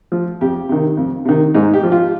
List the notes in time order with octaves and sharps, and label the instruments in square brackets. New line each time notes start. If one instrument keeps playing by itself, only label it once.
[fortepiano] F3
F2 G4
C3 D#3
F2
C3 D#3
G#2 D#4
G4
F3
F4